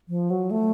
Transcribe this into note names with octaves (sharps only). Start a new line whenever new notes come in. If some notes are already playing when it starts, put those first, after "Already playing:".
F3
F#3
A3